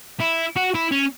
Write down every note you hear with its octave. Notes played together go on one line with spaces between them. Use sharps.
E4
F#4
E4
C#4